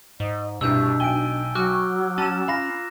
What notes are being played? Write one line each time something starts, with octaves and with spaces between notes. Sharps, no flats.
G#2 D#5
C2 G2 B2 D4 E6 G6
B1 G5 G#5 D7 G7
F#3 F#4 D6 F6 F#6
C#4 A5 A6 E7
F4 F5 A#5 B5 A#6